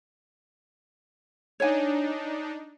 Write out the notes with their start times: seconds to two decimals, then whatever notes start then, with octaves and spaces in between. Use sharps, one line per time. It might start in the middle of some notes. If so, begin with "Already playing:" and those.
1.60 D4 D#4 C#5 G#5